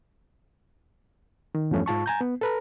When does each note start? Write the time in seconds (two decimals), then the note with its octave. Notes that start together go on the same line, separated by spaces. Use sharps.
1.55 D#3
1.71 E2 G2 F3 A3 C#4
1.86 G#2 F4 A5 C#6
2.06 G#5 A#5 G6
2.21 B3
2.41 A4 B4 A#5